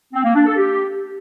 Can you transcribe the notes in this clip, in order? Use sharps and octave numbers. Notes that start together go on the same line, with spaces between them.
C4
A#3
D4
A4
G4